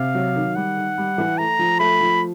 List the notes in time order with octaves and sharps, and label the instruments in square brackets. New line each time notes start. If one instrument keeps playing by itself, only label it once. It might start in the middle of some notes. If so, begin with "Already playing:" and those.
Already playing: [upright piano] C3 [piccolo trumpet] F5
[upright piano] F#3
D#3
[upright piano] G3 [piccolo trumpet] F#5
[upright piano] D#3
G3
E3
[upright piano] A3 [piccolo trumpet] A#5
[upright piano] F3
[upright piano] A3 [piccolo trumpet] B5
[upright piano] F3